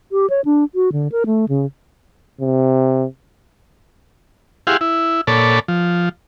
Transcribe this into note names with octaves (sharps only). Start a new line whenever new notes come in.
G4
C#5
D4
F#4
D3
A#4
A3
C#3
C3
E4 G4 G#4 F5 F#5 C6
E4
A#2 A4 C#5 D5 A5 B5
F3